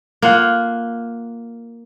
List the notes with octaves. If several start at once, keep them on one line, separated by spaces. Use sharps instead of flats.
A#3 F4 F#5